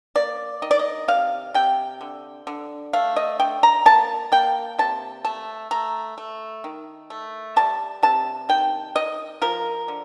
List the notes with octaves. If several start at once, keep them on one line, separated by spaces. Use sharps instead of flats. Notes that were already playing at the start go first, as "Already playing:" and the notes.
A#3 D5
D#3 D#5
D5
D#5
C3 F5
C3 G5
D3
D3
A3 F5
D#5
D3 G5
A#5
A#3 A5
A#3 G5
C3 A5
A3 A5
A3 A#5
A3
D#3
A3
G3 A5
C3 A5
D#3 G5
D#3 D#5
F3 A#4
D3